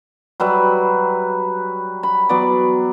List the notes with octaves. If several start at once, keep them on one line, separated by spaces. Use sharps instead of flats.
F#3 G3 B4 E5
B5
F#3 B3 D5